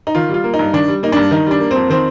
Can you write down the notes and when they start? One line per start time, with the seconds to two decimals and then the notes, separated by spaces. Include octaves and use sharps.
0.07 D#4
0.15 D#3 F4
0.29 G3 F4
0.44 A#3
0.54 D#4
0.59 G2
0.73 D#3 D4
0.88 G3
1.03 A#3 D#4
1.12 G2 D4
1.31 D#3 D#4
1.47 G3 D4
1.60 A#3
1.71 F2 C4
1.90 D#3 C4